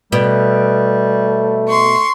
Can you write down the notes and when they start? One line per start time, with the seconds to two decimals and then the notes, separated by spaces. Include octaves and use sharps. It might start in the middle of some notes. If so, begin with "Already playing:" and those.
0.12 B2 G3 A3
1.68 C6 C#6